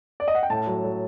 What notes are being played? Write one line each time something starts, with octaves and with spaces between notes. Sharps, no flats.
D5
D#5
F#5
G5
A2 A5
F#3
F#3